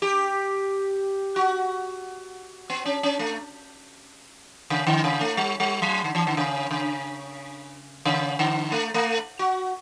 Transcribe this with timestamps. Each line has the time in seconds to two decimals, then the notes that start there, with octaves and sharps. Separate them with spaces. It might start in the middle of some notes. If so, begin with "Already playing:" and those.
0.02 G4
1.36 F#4
2.70 B3
2.86 C#4
3.03 C#4
3.19 A3
4.70 C#3
4.87 D3
5.04 C#3
5.21 A3
5.37 G3
5.60 G3
5.82 F#3
6.04 D3
6.15 E3
6.27 D3
6.37 C#3
6.71 C#3
8.05 C#3
8.39 D3
8.72 A3
8.94 A3
9.39 F#4